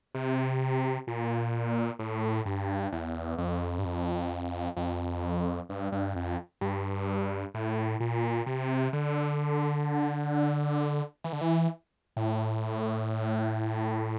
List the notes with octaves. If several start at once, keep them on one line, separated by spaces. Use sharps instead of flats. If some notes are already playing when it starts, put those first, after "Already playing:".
C3
A#2
A2
G2
E2
F2
G2
F2
F2
G2
G2
F2
G2
A2
A#2
C3
D3
E3
D3
E3
A2